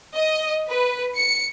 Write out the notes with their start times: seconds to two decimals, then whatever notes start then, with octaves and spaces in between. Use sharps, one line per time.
0.14 D#5
0.68 B4
1.16 C#7